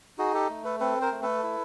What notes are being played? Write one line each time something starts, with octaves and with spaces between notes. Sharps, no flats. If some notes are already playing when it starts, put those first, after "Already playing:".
D#4 F#4 G#4
G4 A4
A3
A4 B4
C4 A4 B4
A#4 C5
A3
A4 B4
E4